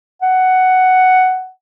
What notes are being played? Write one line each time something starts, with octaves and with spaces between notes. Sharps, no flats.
F#5